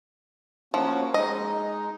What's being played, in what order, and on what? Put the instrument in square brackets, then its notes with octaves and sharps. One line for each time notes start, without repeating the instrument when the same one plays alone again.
[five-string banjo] F3 [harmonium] A#3 C#4 F#4
[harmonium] G#3 D#4 [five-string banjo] D#5